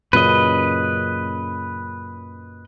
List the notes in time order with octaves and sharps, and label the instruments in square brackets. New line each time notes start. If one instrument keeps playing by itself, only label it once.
[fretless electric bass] F#2 A#2 C#3 [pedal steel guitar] B4 D#5